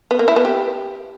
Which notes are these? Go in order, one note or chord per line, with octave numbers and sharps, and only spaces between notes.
B3
A#3
E4
B3
G4